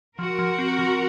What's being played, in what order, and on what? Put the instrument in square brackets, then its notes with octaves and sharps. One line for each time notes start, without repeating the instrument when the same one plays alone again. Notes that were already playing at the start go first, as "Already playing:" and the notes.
[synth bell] F3 [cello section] F#4 A#4
[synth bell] F3
C4
F3